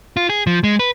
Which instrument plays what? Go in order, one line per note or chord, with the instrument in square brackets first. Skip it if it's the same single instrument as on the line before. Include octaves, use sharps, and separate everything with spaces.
[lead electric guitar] F4
G#4
F3
G#3
B4